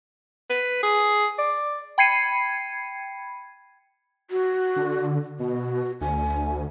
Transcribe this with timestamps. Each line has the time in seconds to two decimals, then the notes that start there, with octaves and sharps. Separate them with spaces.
0.50 B4
0.83 G#4
1.38 D5
1.98 G5 B5 G#6 C7 C#7 D#7
4.31 F#4
4.76 D3
5.39 B2 F#4
6.01 D2 G#5